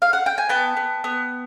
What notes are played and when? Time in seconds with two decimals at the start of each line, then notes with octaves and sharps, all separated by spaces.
0.02 F5
0.13 F#5
0.26 G5
0.38 G#5
0.49 B3 G5 A5
0.77 B3
1.04 B3